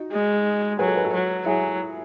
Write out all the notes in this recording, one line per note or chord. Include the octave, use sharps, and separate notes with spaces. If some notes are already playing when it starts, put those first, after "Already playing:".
Already playing: D#4 F#4
G#3
F#3 G#4 B4
F#4 A4
G#4 B4
F#4 A4
F#3
F#3 E4 G#4